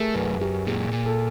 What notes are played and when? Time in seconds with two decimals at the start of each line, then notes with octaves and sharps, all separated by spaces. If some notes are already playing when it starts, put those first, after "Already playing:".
Already playing: A3 G4 G#4 A#4
0.15 F#2 B4
0.41 F#2 G4
0.67 A#2 G#4
0.92 A#2
1.06 A4